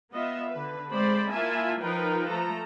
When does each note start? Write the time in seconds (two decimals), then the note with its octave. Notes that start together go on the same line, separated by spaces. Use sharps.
0.13 B3 F4 D#5 E5
0.51 D3 B4
0.91 G#3 A3 C4 C5 D5 B5
1.31 A#3 E4 F4 E5 G#5 A5
1.81 F3 D#4 F4 A#4 B4 G5
2.28 F3 A3 A4 A#5